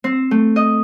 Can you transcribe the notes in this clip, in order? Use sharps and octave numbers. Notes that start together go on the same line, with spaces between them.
C4
A3
D#5